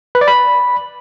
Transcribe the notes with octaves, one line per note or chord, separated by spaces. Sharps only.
B4
D5
B5